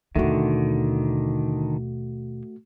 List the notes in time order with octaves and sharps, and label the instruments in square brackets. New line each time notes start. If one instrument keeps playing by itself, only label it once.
[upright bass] D#2 B2 [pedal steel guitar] D3 D#3 [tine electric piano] A3 F#4